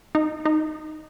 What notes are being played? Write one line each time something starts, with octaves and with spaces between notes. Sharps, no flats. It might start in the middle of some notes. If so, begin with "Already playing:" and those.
D#4
D#4